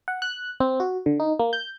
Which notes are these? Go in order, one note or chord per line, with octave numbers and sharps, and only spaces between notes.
F#5
F#6
C4
F#4
D3
D#4
A#3
G6